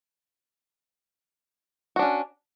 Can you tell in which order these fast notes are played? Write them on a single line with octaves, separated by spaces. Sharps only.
F#4 D4 C#4